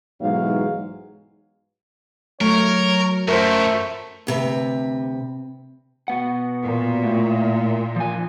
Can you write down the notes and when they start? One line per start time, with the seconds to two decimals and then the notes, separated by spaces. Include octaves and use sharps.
0.20 B1 G#2 E3 F#3 G#3 F5
2.41 F#3 A3 A#4 C#5
3.28 F#2 A3 A#4 C5
4.27 D2 C3 B4
6.08 B2 B3 F#5
6.63 A#2
7.04 A2
7.96 F3 G#5